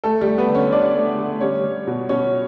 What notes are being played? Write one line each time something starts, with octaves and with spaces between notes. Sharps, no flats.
A3 A4
G3 G4
A3
B3 B4
D3
C#4 C#5
D3 D4 D5
A3
A3
G3 C#4 C#5
G3
B2
B2 C#4 C#5